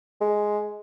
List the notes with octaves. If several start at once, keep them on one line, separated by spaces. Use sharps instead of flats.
G#3